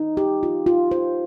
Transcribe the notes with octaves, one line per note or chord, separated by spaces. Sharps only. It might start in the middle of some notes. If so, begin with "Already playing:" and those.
Already playing: D#4
G4
F4
F4
C5